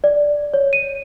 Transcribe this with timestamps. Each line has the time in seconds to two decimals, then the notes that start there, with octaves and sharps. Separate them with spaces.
0.04 D5
0.54 C#5
0.73 D#7